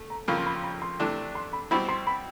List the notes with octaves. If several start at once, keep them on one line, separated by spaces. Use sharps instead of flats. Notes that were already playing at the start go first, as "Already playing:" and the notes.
Already playing: A3
A#5
F2 C#3 F3 A#3 B5
C6
B5
C6
B5
C6
C3 E3 A3 D4
C6
B5
B2 G3 C4 E4 B5
C6
B5